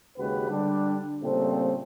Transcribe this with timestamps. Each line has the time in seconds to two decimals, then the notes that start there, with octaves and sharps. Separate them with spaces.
0.18 D#2 C#3 G#3 F#4 G4 B4
0.49 D3 G3 D4
1.21 A#2 C#3 G3 A3 C4